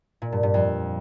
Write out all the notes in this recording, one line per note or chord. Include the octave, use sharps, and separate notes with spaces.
A#2
G2
G2
F2